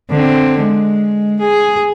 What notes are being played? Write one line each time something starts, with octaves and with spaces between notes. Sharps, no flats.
D3 C4
G#3
G#4